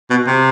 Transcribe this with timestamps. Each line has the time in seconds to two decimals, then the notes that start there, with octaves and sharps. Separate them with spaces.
0.10 B2
0.27 C3